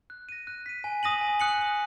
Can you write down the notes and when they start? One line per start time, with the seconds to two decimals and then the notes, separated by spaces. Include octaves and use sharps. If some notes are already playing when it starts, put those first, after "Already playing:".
0.10 F#6
0.29 A#6 D#7
0.47 F#6
0.66 B6 D#7
0.84 G#5
1.03 D#6 A#6 D#7 F#7
1.21 G#5
1.40 D#6 F#6 C#7 F#7
1.58 F#6